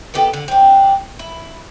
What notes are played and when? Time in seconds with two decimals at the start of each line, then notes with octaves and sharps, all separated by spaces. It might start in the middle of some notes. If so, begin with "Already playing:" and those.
0.14 D#3 B3 G4 A4
0.33 D3
0.48 C4 D4
1.19 E4